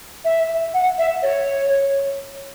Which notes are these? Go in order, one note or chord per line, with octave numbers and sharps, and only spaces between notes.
E5
F#5
E5
C#5